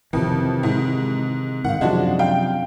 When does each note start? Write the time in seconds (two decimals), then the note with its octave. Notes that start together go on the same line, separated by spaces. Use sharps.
0.13 F2 C3 D#3 E3
0.63 G#2
1.65 G#2 D#3 F5 F#5
1.81 F#2 C3 F3 G#3 D4 F#4
2.19 F5 G5